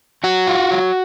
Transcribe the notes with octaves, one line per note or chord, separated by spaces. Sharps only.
F#3 F#4
F4
F#3